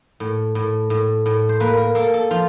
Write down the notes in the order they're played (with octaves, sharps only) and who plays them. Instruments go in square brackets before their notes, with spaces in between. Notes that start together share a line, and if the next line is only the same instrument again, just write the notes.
[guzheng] A2
A2
A2
A2
C5
A#3 B4
A#4
A#3 A4
A4
F3 F4